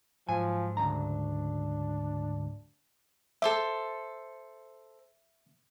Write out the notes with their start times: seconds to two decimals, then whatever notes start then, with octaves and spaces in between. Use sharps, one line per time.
0.29 G#2 F3 F#3 G#5
0.77 D2 C#3 D4 A#5
3.42 A4 C5 E5 D6